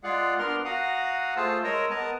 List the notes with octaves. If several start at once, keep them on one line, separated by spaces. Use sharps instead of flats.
G#3 F4 G#4 D5 F5 F#5
B3 D4 A#4 C6 F6
F#4 F5 F#5 A#5 D#6
A3 F4 G#4 C5 A5 E6
G#3 A#4 C#5 D#5 A#5 E6
B3 A#4 D#5 A5 A#5